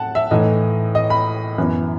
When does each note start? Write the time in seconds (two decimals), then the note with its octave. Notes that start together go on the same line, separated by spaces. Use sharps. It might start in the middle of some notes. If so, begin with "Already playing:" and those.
Already playing: A2 F#5 A5
0.15 E5
0.31 A2 E3 A3 D#4 D#5
0.95 D#5
1.10 B5
1.58 F#2 E3 B3